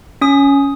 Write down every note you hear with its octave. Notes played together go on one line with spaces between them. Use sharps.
C#4 D#6